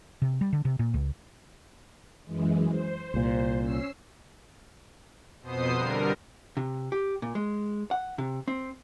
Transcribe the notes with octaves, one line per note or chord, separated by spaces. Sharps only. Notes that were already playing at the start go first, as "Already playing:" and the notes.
C3
G3
D3
C3
A#2
C#2
F#2 E3 G#3
C5
C2 A#2
C#4 E6 C7
F2 B2 B3 C5 D#6 C7
D3 G3 A#4
C3
G4
A#2
G#3
F#5
C3
C4